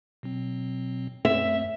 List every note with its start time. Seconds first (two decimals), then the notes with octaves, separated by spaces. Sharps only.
0.23 B2 F#3 C4
1.25 F#2 A3 C4 E5